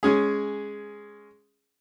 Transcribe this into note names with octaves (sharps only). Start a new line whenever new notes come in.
G#3 C#4 G#4